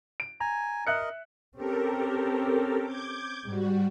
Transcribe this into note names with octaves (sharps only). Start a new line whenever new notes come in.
D7
G#5 A#5
A#4 D#5 E5 F#6 C#7
C4 C#4 G4 A4 A#4
D6 G6 G#6
G#2 G3 F#4